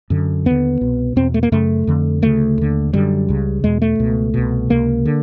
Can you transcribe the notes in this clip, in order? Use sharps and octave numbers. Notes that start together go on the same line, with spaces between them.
F#2 D3
D#2 D3 B3
C2 B2
E2 B2 C4
A3
A#3
F#2 C#3 A3
F2 D3
D2 C#3 A3
D#2 D3
F#2 D3 G3
C#2 C#3
E2 B2 G#3
A3
C#2 B2
C2 B2
C#2 C3 A#3
D3